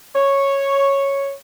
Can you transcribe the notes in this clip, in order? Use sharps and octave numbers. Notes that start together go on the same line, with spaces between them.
C#5